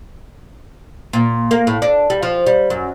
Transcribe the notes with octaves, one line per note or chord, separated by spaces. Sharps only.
A#2
A#3
A2
D4
G3
F3
G3
F#2